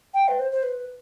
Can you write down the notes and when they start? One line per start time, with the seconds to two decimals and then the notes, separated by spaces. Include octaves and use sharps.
0.13 G5
0.28 B4
0.39 C5
0.51 C5
0.63 B4